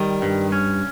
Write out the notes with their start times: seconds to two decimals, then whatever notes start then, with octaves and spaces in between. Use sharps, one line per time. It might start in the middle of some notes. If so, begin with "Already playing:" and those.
Already playing: D#3 G3
0.22 G2
0.52 C#4